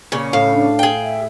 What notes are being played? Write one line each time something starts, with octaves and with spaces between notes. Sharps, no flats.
A#2 C#3 C#4
A2 F5 A5 C6
D4
G#4 G5
E5